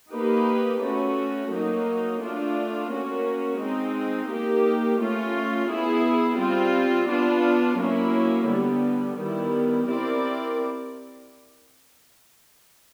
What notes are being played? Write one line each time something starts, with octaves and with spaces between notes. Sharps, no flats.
A#3 D#4 G4 B4
A3 C#4 F#4
F#3 A#3 D#4
A3 D4 F4
A#3 C#4 F#4
G#3 C4 D#4
A#3 D#4 G4
A3 C#4 F4
B3 E4 G#4
G3 C4 F4
B3 D4 F4
F#3 A#3 C#4 E4
D3 G3 B3
D#3 G3 B3 E4
C4 E4 G4 A#4 D5